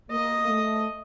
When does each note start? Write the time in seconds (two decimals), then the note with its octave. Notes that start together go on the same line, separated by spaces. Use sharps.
0.11 A#3 D#5
0.48 A3